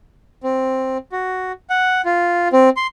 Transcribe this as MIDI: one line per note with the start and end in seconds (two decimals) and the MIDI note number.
0.43 0.97 60
1.12 1.52 66
1.70 2.01 78
2.05 2.48 65
2.53 2.69 60
2.77 2.87 84